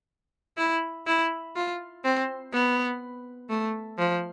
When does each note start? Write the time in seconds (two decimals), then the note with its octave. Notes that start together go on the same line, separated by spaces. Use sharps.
0.58 E4
1.07 E4
1.56 F4
2.05 C4
2.54 B3
3.50 A3
3.99 F3